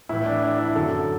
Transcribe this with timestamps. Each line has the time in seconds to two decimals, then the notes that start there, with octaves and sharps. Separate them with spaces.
0.09 A2 E3 E4
0.26 D4
0.42 D4
0.58 E4
0.75 F#2 D3 A4